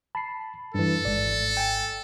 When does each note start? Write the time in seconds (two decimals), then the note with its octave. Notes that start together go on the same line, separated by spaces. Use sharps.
0.15 A5 B5 C7
0.74 G2 E3 A4
1.05 G#1 G#2 D5
1.57 G5 G#5